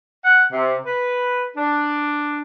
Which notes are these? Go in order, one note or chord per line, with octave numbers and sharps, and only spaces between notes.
F#5
C3
B4
D4